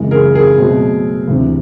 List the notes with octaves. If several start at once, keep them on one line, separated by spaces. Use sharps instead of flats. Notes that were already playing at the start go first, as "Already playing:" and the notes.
Already playing: F#2 C#3 E3 G#3
G#4 A#4
G#4 A#4
B2 F#3 A3 C4
D2 C3 E3